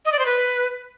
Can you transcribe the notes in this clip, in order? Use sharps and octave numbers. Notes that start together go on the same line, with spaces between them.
D#5
D5
C5
B4